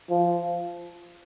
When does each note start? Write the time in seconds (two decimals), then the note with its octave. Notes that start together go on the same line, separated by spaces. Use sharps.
0.10 F3